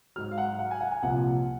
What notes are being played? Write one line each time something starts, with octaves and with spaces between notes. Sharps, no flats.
G#2 F#3 F6
F5
F#5
F#5
G#5
F#5
G#5
C2 A#2 F3 F#5